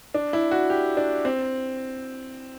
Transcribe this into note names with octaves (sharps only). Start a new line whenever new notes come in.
D4
E4
F#4
G4
D4
C4